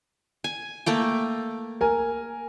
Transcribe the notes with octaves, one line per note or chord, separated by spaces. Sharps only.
G#5
A3 A#3 G5
A#4 G#5